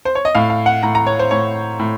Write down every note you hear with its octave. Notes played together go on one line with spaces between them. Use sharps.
C5
C#5
D#5
A2 F5
F5
F#5
A2 A#5
A#5
C#5
C5
A2 C#5
A2